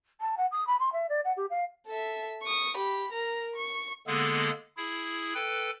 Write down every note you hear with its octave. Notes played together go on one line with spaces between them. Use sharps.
A5
F#5
D#6
B5
C6
E5
D5
F#5
G4
F5
A4 E5
C#6 D#6
G4 B5
A#4 A#5
C#6
D3 G#3 A#3 B3 G#4 A4
E4 G#4
A4 B4 G5